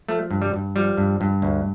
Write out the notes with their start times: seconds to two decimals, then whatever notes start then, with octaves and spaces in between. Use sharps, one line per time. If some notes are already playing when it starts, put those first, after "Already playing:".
0.09 F3 A3
0.31 G2
0.42 G3
0.54 G2
0.76 F3 G3
0.97 G2
1.21 G2
1.42 D2